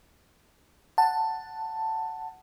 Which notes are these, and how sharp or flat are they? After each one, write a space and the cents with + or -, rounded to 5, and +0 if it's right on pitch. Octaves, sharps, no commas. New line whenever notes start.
F#5 +0 A5 +10